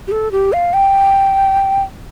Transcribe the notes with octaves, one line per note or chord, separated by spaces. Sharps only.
G4
A4
G4
F5
G5